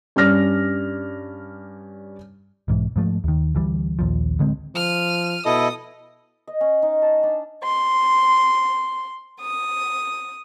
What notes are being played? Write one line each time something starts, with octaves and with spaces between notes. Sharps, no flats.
G2 C#4 D5 F6 A#6
B1 G#2 E3
G#2 F3 A3
D#2 D#3
D2 E3 G3
A#1 D#2 F3
D1 D3 G#3 C4
F3 F6 D#7
B2 E4 A4 D#5 D#6
D#5
C#4
D#4
A5
D4
C6
D#6